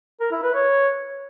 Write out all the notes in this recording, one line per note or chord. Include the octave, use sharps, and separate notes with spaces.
A#4
E4
B4
C#5